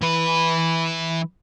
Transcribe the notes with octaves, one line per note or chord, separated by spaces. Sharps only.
E3 B4